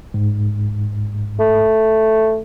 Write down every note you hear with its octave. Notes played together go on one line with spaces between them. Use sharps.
G#2
A3